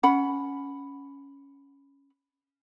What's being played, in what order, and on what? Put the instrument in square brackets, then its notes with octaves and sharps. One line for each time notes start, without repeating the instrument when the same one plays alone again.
[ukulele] C#4 F#5 B5